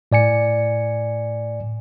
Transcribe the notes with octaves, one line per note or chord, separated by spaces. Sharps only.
A2 D5 G#5 C#7